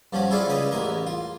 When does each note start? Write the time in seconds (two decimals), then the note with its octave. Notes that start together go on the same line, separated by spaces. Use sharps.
0.13 G2 F3 C#4 F#4
0.31 E4 F4 G#4 A4 D5 F5
0.47 C#2 C#3 B4 D#5
0.71 A1 E2 A#4 D#5
1.06 F4